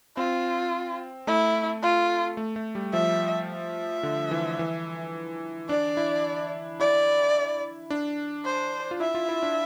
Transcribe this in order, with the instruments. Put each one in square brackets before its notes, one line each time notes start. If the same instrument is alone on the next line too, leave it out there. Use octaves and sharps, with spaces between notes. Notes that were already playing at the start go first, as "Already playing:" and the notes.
[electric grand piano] C4 [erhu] F4
[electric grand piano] A3 [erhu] E4
[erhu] F4
[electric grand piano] A3
A3
G3
[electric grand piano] F3 [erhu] E5
[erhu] E5
[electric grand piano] D3
E3
E3
[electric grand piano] D4 [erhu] D5
[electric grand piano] E4
[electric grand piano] E4 [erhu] D5
[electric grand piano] D4
[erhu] C5
[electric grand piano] F4
[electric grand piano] E4 [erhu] E5
[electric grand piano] F4
E4
D4